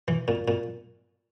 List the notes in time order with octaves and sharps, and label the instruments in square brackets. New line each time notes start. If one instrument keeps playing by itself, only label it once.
[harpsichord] E3
A#2
A#2